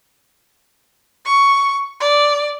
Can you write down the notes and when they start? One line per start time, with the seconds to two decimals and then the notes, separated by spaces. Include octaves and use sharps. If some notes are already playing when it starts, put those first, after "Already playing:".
1.25 C#6
2.01 D5